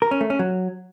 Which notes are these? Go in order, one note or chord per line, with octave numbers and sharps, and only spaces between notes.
A#4
C#4
A3
C#4
F#3